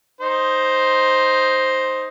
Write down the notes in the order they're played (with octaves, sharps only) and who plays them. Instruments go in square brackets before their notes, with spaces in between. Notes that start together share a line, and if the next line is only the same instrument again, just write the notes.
[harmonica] D#4 C5